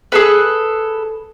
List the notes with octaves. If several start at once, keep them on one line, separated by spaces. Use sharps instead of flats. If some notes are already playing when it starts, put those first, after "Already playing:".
G#4 A4 B4